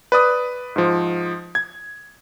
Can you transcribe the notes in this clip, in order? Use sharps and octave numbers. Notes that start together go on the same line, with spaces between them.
B4 D5 D#6
G#2 F3
G#6